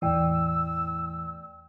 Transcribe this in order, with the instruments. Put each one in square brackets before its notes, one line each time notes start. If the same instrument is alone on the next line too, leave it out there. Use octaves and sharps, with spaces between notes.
[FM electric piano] E2 A2 E3 [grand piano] D5 G5 [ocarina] E6